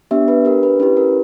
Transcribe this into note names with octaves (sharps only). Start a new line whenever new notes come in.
B3 D4 G4 E5
B4
D4 G4 A#4
B4
C#4 E4 G4 B4
A#4